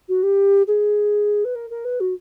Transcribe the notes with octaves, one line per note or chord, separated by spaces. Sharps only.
F#4
G4
G#4
B4
A#4
A#4
B4
F#4